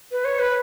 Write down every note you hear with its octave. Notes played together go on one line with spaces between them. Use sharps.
B4
C#5
B4